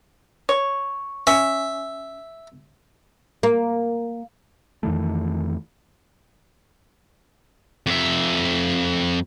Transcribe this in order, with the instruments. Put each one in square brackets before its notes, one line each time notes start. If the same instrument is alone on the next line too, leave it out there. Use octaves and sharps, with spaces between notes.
[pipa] C#5
[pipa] C#4 [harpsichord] E5
[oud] A#3
[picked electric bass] F2 D#3 E3 A3
[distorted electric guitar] F2 E5